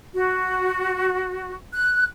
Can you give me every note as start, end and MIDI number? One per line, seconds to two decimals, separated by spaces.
0.14 1.54 66
1.73 2.04 90